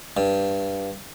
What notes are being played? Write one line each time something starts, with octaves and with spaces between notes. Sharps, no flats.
G2